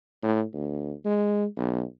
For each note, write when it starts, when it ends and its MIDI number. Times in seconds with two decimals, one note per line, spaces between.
0.23 0.42 45
0.53 0.93 38
1.05 1.45 56
1.57 1.82 35